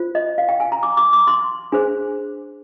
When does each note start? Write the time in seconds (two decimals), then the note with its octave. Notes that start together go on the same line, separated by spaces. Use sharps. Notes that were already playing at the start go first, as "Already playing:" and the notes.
Already playing: F4 C5
0.15 D#5
0.38 F5
0.49 G5
0.60 G#5
0.72 A#5
0.83 D6
0.97 D6
1.13 D6
1.27 C6
1.72 D4 G#4 C5